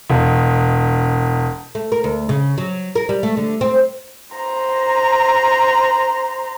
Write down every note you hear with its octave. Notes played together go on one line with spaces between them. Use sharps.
E1
A3
A#4
D2
C#3
F#3
A#4
G3
A3
D3
C4
C5 A#5